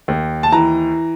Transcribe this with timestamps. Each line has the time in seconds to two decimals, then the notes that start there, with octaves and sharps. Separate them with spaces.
0.08 D#2
0.43 A5
0.52 E3 A#5